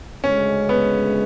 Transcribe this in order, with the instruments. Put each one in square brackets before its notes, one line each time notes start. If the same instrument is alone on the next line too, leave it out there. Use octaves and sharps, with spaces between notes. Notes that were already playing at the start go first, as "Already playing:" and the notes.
[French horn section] D2 C#3 G#3 [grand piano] C#4
[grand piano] B3